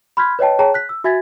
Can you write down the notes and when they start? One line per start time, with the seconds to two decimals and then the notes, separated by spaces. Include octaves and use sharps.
0.17 B5 C6 F6 G6 G#6 B6
0.39 B4 C#5 D#5 G5 A5
0.59 G#4 C#5 G5 A5 A#5
0.74 F#6 B6
0.89 E6
1.04 F#4 E5 G#5 G#6 A6 B6